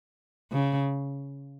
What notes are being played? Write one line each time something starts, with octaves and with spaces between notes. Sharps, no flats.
C#3